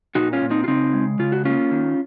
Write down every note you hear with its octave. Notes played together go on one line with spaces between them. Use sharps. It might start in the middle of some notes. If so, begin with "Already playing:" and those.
A#2 D#4 F#4
C#4 F4
A#2
C4 D#4
F4
C#3 C4 D#4
G#3
C#3 F4
F#4
A#3 C#4 F4
D#3